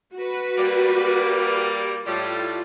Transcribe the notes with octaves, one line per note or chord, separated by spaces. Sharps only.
F#4 B4
G3 A#3
A2 G3 F4